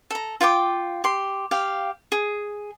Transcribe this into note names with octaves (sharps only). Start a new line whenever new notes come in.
A4 A#5
F4 F5 G5 D6
G4 C6
G4 F5 G5
G#4